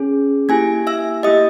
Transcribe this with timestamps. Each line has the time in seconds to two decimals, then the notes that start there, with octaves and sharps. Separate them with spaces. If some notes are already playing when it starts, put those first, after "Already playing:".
Already playing: C#4 G#4
0.49 A#3 E4 G4 G#5 G#6
0.87 E5 E6
1.23 A#3 E4 G4 D#5 D#6